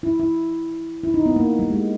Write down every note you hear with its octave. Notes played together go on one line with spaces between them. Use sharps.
E4
E4
E4
D#4
B3
A#3
G3
G#3